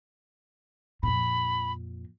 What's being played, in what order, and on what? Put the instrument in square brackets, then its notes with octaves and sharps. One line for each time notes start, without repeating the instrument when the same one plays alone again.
[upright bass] F2 A#2 [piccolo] B5